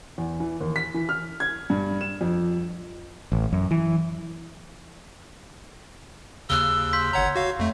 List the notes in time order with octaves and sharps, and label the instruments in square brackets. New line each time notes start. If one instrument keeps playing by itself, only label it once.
[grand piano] E2
E3
D#2
B6
E3
F6
G#6
G2
E7
F2
[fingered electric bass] A1
F#2
E3
[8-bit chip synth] D#2 C#3 [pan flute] E6 [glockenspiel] F#6 G7
[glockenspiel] C6 G6 B6
[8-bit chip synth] G1 F#5 A#5 [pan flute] C#5
[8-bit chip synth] F#4 F5
F2 A3